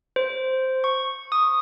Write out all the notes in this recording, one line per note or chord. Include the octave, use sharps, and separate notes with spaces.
C5
C#6
D#6